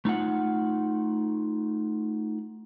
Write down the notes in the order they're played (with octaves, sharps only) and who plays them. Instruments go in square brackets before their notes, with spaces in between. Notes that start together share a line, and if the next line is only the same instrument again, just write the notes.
[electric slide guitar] A3 D#4 F4 F#5